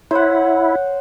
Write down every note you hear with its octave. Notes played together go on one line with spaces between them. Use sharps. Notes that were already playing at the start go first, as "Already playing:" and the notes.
E4 C5 C#5 F#5